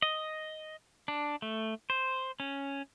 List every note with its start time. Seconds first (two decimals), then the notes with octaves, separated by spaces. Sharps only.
0.02 D#5
1.08 D4
1.42 A3
1.90 C5
2.40 C#4